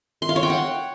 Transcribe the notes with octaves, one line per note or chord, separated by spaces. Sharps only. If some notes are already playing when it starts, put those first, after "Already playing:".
C6
F5
C#5
G5
F#5